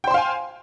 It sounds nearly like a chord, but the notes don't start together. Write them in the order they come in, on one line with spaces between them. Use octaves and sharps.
G5 C5 C6 F5 G#5